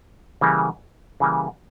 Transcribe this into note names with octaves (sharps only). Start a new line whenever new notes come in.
C#3 E3 G3 A#3
C#3 E3 G3 A#3